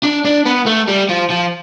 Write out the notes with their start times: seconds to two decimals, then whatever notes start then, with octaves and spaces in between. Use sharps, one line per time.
0.04 D4
0.25 D4
0.46 B3
0.67 A3
0.88 G3
1.09 F3
1.30 F3